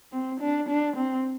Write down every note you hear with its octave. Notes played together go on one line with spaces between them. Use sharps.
C4
D4
D4
C4